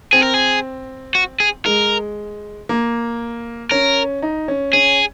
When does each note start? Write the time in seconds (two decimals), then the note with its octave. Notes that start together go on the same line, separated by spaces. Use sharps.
0.13 C4 G#4
0.23 A#4
0.34 G#4
1.15 F#4
1.40 G#4
1.66 G#3 A#4
2.69 A#3
3.71 C#4 A#4
4.22 D#4
4.48 C#4
4.73 C#4 G#4